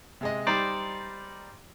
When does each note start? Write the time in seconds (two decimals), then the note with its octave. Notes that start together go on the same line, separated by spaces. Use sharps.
0.21 C3 G#3 D#5
0.47 G3 D#4 C5 D5 A#5